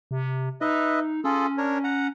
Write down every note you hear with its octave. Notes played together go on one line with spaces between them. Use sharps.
C3
D#4 B4 D#5 E5
C#4 F4 G#4 A4
D4 A#4 C#5
F#5 A#5